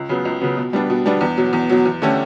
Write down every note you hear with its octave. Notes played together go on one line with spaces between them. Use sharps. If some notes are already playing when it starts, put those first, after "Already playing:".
Already playing: C#2
C#3 F#3 B3
C#2
C#3 F#3 B3
B2
G3 B3 D4
B2
G3 B3 D4
E2
B2 F#3
E2
B2 F#3
E2
D3 A3 C#4 G4